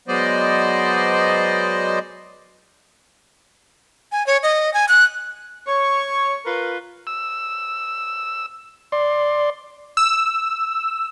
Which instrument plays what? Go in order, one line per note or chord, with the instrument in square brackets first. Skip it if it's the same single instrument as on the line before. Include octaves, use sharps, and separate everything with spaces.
[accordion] F#3 G#3 B3 C5 D5 D#5
[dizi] G#5
C#5
D#5
G#5
F#6
[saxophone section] C#5 [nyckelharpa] C#6
[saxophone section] F4 A#4 B4
[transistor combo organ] E6
D5 C6
[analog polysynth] E6